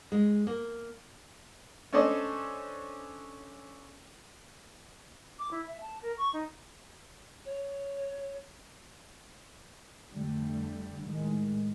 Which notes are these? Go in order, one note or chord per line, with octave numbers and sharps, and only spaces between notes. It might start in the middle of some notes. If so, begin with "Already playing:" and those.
G#3
A#3
C#4 D4 A4 C5 D5 D#5
D6
E4
E5
A5
A#4
C#6
D#4
C#5
F2 D3 G3 A3
A2 D#3 G#3